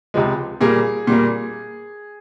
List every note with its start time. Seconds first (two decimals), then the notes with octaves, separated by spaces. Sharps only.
0.14 C#2 C3 F3 G#3
0.61 A#2 G3 A#3 G#4
1.07 A#2 G3 A#3